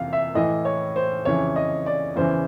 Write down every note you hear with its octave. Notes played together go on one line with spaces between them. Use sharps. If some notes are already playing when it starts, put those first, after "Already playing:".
Already playing: F2 C3 E3 F5
E5
A2 E3 D#5
C#5
C5
F2 C#3 E3 C#5
D#5
D5
E2 C#3 E3 C5